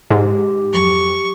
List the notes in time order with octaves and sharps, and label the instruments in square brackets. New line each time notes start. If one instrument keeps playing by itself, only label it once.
[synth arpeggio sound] G#2 [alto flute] G4
[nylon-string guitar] F2 F#3 [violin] C#6